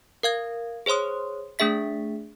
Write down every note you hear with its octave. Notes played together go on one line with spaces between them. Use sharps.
A#4 F5 G#6
G#4 C5 C#5 C6 D#6
A3 D4 G#4 E5 B6